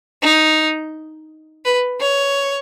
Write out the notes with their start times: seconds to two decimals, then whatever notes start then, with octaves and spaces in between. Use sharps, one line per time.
0.22 D#4
1.65 B4
2.01 C#5